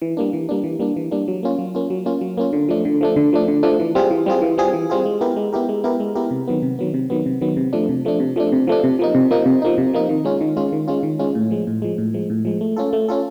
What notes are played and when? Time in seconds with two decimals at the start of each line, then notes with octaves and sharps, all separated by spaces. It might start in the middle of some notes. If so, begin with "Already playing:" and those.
0.02 E3
0.17 G3 A#3 D4
0.33 E3
0.49 G3 A#3 D4
0.64 E3
0.80 G3 A#3 D4
0.96 E3
1.11 G3 A#3 D4
1.28 F#3
1.43 A#3 C#4 F4
1.59 F#3
1.75 A#3 C#4 F4
1.90 F#3
2.06 A#3 C#4 F4
2.21 F#3
2.37 A#3 C#4 F4
2.53 D3
2.69 F3 A3 D4
2.85 D3
3.01 F3 A3 D4
3.16 D3
3.33 F3 A3 D4
3.48 D3
3.63 F3 A3 D4
3.80 E3
3.95 G3 C4 F4 G#4
4.11 E3
4.26 G3 C4 F4 G#4
4.42 E3
4.58 G3 C4 F4 G#4
4.73 E3
4.90 G3 C4 F4 G#4
5.06 G#3
5.21 B3 E4 G4 A#4
5.36 G#3
5.53 B3 E4 G4 A#4
5.69 G#3
5.84 B3 E4 G4 A#4
6.00 G#3
6.15 B3 E4 G4 A#4
6.31 C3
6.48 D#3 F#3 B3
6.62 C3
6.79 D#3 F#3 B3
6.94 C3
7.10 D#3 F#3 B3
7.26 C3
7.41 D#3 F#3 B3
7.57 C3
7.73 F3 A3 D4
7.89 C3
8.05 F3 A3 D4
8.20 C3
8.36 F3 A3 D4
8.52 C3
8.67 F3 A3 D4
8.84 C3
8.99 F3 A#3 D#4
9.15 C3
9.31 F3 A#3 D#4
9.46 C3
9.62 F3 A#3 D#4
9.78 C3
9.93 F3 A#3 D#4
10.09 D#3
10.25 G#3 C#4 F4
10.41 D#3
10.56 G#3 C#4 F4
10.73 D#3
10.88 G#3 C#4 F4
11.03 D#3
11.19 G#3 C#4 F4
11.35 A2
11.51 F3 G#3
11.67 A2
11.82 F3 G#3
11.98 A2
12.14 F3 G#3
12.30 A2
12.45 F3 G#3
12.61 A3
12.77 C#4 F4 A4
12.93 A3
13.09 C#4 F4 A4